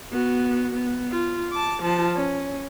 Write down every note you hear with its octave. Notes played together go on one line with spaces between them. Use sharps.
B3 F#4
B3
F4
A5 D6
F3 A5
C#4